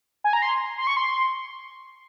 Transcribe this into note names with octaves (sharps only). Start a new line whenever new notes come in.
G#5
A#5
C6
C6
C#6
C6